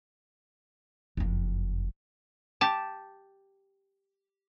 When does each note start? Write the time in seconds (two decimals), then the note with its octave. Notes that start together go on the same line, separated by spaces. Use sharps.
1.17 F#1 F2
2.61 G4 A5